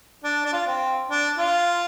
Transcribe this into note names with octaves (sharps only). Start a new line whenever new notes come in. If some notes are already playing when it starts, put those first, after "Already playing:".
D4
D4
F4
C4
D4
F4